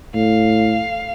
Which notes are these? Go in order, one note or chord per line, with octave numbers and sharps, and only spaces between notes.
A2 F5